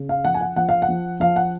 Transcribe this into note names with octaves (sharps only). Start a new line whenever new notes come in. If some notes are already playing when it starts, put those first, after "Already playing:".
Already playing: C#3
F5
F3 F#5
G#5
F#5
F3 F#5
F5
F#5
F3
F3 F5
F#5